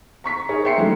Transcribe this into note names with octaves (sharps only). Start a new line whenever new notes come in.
A#5 C#6 B6
D#4 G#4 A#4 C#5
E5 G5 A#5 C6 C7 C#7
F#3 G3 A3 C#4 D#4 F#4